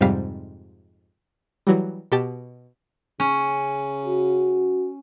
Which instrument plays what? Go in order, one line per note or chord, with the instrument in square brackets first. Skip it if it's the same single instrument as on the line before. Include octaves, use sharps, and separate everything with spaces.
[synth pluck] F2 G#2 C3 G3 F5 B6
E3 F#3 G3
B2 G4 A5
[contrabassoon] C#3 [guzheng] C#4
[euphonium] F#4